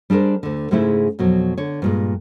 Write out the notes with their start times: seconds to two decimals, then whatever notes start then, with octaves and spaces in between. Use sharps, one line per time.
0.10 G3 D4 G#4 A#4 C5
0.43 D2 D3
0.71 G#2 C#3 G#3 A3 D#4 E4
1.19 F2 B2 F#3
1.58 D3 C#5
1.82 G2 A#2 G#3